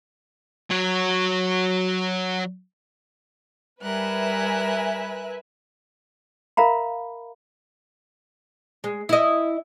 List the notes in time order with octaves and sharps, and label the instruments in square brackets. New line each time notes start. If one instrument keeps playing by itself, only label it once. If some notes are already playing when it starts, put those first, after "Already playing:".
[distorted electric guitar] F#3 C#5
[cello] G3 [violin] A#4 F#6 [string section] B4 E5 G#5
[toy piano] A#4 E5 F5 A#5 B5
[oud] G#3
E4 D#5